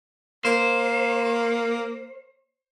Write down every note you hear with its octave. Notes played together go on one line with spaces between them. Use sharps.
A#3 C5